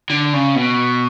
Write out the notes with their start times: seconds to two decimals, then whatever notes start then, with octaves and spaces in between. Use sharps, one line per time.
0.10 D3
0.33 C#3
0.56 B2